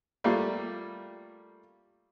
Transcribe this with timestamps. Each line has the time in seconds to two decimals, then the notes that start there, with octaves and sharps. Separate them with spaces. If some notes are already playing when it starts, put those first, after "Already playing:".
0.24 G3 A3 A#3 F4